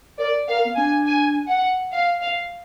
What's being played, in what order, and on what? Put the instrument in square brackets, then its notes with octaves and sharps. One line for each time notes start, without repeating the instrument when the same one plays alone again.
[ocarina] A#4 [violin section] D5
[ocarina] A#4 [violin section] F5
[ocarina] B3
[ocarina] D4 [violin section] G#5
[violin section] G#5
F#5
F5
F5